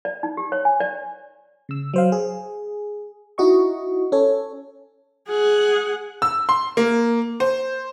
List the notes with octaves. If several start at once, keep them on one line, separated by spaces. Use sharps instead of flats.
D5
D#4
G4
C#5
G#5
D5
C#3 E6
F#3 C5 F5
G#4
D#4 E4 F#4 D#5 C#6
C#4 A4 C#5
G#4 F#5
E6
C6
A#3
C5